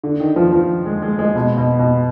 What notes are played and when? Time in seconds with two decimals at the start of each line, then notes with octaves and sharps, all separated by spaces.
0.04 D3
0.20 D#3
0.36 F3
0.53 F3
0.86 G#3
1.02 G#3
1.19 G#3
1.35 B2
1.57 B2
1.79 B2